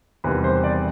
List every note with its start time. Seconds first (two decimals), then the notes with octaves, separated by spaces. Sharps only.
0.24 E2 C3 D#3 G3 B4
0.44 C5
0.64 D5